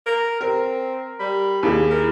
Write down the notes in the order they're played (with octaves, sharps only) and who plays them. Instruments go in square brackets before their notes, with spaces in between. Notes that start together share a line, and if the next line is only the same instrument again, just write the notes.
[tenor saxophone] A#4
[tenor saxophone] C4 [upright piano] A#4
[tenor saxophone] G3 [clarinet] B5
[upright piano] D#2 G#4 [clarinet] E4
[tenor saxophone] A#4